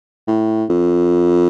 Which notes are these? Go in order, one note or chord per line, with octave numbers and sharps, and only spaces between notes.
A2
F2